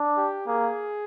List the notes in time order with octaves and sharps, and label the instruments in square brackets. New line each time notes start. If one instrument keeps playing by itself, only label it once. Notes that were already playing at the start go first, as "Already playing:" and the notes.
Already playing: [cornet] D4
[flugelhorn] G4
[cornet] A#3 [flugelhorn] G#4